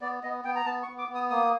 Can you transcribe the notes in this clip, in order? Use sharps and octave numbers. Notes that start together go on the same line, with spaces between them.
B3 D5
B3 D#5
B3 G5
A#5
B3 A5
C#6
B3
D6
B3
D#6
A#3 D#6